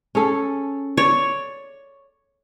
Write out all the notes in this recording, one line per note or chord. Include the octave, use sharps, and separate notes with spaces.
C#4 G#4 A4
C#5 D5